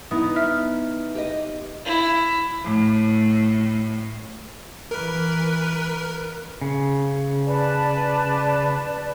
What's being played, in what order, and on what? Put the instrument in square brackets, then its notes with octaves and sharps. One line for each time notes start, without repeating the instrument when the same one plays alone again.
[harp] B3 D#4 [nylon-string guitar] E4 [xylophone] D#6
[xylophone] E5 F6
[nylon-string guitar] G4 B4 D#5
[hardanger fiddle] E4
[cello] A2
[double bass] E3 [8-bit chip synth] A#4 [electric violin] B4
[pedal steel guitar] C#3
[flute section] B4 D5 A5